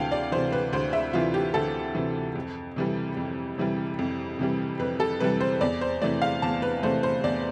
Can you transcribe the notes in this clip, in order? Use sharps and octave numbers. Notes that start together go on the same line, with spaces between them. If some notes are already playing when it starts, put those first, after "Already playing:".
Already playing: D2 C3 E3 F5 G5 A5
D5
C3 E3 C5
B4
D2 C5
E5
C3 E3 F4
G4
D2 A4
C3 E3
F2
C3 E3 G3
F2
C3 E3 G3
F2
C3 E3 G3
F2 B4
A4
C3 E3 G3 B4
C5
E2 D5
C5
C3 E3 A3 D5
F5
E2 A5
B4
C3 E3 A3 C5
C5
E2 D5